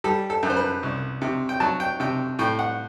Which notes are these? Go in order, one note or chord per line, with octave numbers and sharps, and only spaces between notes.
G3 A4
A4
F#2
C5
B4
C2
C3
G5
F#3 A5
G5
C3 G5
A2 G5
F#5